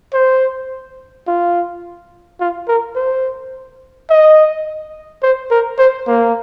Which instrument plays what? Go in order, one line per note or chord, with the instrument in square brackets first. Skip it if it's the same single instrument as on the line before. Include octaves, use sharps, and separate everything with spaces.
[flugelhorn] C5
F4
F4
A#4
C5
D#5
C5
A#4
C5
A#3